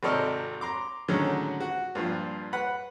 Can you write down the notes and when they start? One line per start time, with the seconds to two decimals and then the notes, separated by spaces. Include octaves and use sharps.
0.03 G#1 C3 A4 A#4 D5 D#5
0.61 A#5 C6 D6
1.08 A2 D3 D#3 F#3 G#3 C#4
1.60 F#4
1.95 G2 A#2 F3
2.53 B4 F#5 B5